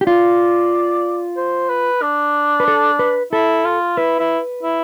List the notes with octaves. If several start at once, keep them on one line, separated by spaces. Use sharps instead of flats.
G4
F4 D5
C5
B4
D4
B4
A4
B4
E4 A4
F4
E4 B4
E4
E4